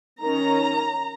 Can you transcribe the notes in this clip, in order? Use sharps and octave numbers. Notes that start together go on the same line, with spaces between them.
D#3 C#4 A#5